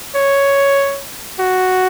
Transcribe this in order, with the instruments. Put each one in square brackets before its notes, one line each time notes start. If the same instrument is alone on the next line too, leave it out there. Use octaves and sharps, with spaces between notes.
[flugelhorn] C#5
F#4